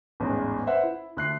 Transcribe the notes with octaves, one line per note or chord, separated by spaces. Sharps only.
A1 E2 G#2
B4 C5 E5 F#5
E4
D2 F#6 C7